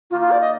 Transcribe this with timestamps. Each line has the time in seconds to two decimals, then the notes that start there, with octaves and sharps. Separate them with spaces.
0.11 D#3 A#3 D#4 F4
0.21 F4
0.31 D5
0.41 D#5